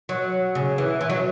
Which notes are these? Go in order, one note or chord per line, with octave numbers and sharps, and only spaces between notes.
F#3
C#3
E3
E3
F#3